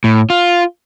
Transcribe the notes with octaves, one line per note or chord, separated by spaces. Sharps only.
A2
F4